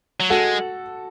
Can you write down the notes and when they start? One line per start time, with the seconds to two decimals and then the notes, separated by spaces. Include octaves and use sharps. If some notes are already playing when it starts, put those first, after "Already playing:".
0.20 F#3
0.30 G#3 F#4 A4